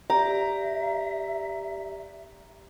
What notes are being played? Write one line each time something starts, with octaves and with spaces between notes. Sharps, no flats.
G4 D5 E5 A#5